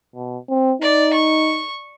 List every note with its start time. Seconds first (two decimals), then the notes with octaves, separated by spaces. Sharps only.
0.16 B2
0.49 C4
0.82 D#4 D5
1.13 C#6